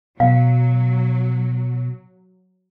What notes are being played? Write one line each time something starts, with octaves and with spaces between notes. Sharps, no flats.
B2 F#3 F5